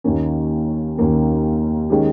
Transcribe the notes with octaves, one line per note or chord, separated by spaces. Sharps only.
D#2 D#3 A#3 C#4
D#2 D#3 A#3 C#4
D#3 G#3 C#4 G4